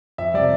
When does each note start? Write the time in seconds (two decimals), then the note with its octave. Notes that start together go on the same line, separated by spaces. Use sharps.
0.18 F2 E5
0.34 C3 G3 D5